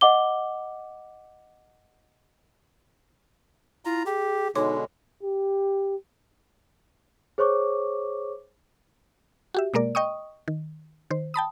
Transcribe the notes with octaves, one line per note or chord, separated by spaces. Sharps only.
D#5 F#5 D6 G7
E4 F4 A#5
G4 G#4
B2 D3 G#3 D#4 C#5 C6 D6
G4
G#4 C5 C#5 C#6 D6
F#4 G4 E5
B2 G#3 A#3 A#4 D5
D#5 G5 C#6 D#6
D#3
D#3 C5
G5 A5 B5 D#6